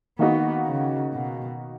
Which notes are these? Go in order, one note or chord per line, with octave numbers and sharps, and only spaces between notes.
D#3 A#3 B3 D#4 F#4
C#3
B2